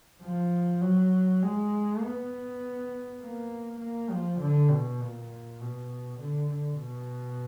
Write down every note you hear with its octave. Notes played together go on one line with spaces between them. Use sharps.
F3
F#3
G#3
B3
A#3
A#3
F3
D3
B2
A#2
B2
D3
D3
B2